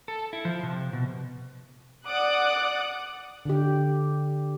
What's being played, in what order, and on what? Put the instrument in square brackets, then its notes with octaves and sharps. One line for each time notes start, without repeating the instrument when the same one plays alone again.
[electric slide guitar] A4
E4
F3
C3
B2
[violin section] D5 F#5 D6 D#6 F#6
[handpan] D3 G4